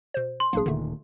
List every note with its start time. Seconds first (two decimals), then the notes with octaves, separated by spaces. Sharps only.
0.14 B2 C5
0.40 C6
0.53 G#1 A#2 F#3 A#3 D4 G#4
0.66 D1 A#2 D3 D#3 A3